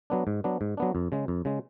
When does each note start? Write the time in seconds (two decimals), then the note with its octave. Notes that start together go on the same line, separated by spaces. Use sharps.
0.10 F#3 B3 D4
0.27 G#2
0.44 F#3 B3 D4
0.61 G#2
0.77 F#3 B3 D4
0.95 F2
1.12 C#3 G#3
1.28 F2
1.45 C#3 G#3